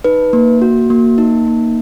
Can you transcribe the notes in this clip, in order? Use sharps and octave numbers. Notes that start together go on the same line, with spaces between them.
D#4 B4
A#3
F#4
A#3
D#4
A#3